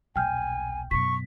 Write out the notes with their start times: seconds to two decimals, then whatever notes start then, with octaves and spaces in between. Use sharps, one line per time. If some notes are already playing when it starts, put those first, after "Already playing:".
0.16 D#1 B1 G5 G#5 F6 G6
0.91 F#2 B2 C#6 B6